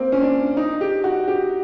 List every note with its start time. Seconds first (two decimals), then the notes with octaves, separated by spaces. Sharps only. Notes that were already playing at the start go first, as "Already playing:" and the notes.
Already playing: A#3 C4
0.12 C#4
0.21 D4
0.57 D#4
0.81 G4
1.04 F#4
1.28 G4